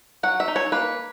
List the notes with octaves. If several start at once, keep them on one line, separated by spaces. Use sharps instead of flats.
F#3 F#5
E5
D#4
C#5
A#3 B4